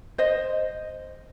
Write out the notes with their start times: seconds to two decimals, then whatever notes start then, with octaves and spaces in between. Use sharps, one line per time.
0.18 C5 D#5